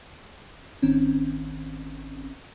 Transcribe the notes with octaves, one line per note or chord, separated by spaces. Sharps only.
G#1 D#3 C4 C#4